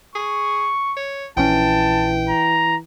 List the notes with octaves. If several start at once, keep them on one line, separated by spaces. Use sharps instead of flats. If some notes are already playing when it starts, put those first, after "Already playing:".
G#4 C#6
C#5
A#1 E3 C#4 G5 A5
A#5